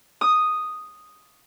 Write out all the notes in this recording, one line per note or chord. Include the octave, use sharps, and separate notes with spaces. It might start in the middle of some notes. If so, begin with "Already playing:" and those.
D#6